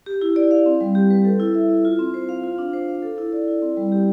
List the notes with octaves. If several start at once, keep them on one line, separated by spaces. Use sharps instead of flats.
G4
E4
D5
F5
C4
G3
G4
B4
A4
E4
E5
E4
F4
C4
C5
F5
F4
D4
C5
F5
A4
E4
D5
E4
C4
G3
G4